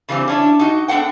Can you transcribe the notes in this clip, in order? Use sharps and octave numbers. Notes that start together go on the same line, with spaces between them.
C#3 E3 G3 B3 C4
C#4 D4 E4
D#4 F#4
B3 D4 A4 F#5 G5